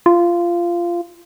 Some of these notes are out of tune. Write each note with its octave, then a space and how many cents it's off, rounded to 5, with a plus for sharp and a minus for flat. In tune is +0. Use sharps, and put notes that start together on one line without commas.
F4 -15